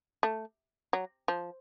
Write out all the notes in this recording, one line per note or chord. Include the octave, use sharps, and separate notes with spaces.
A3
F#3
F3